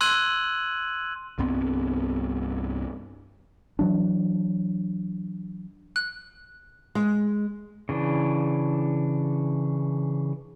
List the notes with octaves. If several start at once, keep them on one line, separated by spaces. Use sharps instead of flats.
C6 E6 F#6 G#6 D#7 F#7
C2 G2 B3 C4
E3 F#3 D4
F#6
G#3
C#3 E3 D4